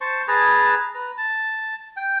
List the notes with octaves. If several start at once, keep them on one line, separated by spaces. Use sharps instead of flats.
C5 A5 C#6
G#4 B4 A5 A#5
B4 A#5
A5
G5